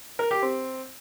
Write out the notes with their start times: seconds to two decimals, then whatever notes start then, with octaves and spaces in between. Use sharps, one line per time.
0.19 A#4
0.31 G4
0.42 C4